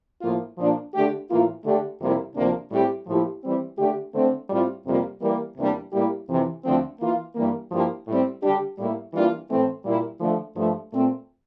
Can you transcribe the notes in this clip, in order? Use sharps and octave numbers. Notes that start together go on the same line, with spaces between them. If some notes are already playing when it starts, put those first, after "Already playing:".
A2 F3 A#3 F4
A#2 F3 A#3 D4
D3 A3 D4 G4
A2 E3 A#3 F4
D3 A3 D4 G4
F2 C3 G3 A#3 E4
D2 C3 F3 A#3 D4
A2 G3 C4 G4
A2 F3 A#3 E4 G4
E3 G3 C4
D3 A3 D4 G4
D3 A3 C4
A2 G3 C4 F4
F2 C3 G3 A#3 F4
E3 G3 A#3
E2 C3 G3 A#3 D4
A2 G3 A#3 E4 G4
F2 C3 E3
D2 D3 F3 A3 C4
E3 A#3 F4
G2 E3 G3 A#3
G2 F3 A#3 E4 G4
A2 G3 C4
D3 G3 D4 G4
A2 G3 A#3 E4
E3 G3 A#3 D4 F4
A2 E3 A3 C4
A#2 G3 A#3 E4
D3 F3 A3
G2 F3 A3
A#2 A3 C4